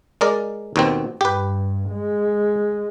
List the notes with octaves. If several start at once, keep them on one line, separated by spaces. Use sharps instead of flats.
G#3 A#4 D5
D#2 B2 C4
G2 G4 B4
G#3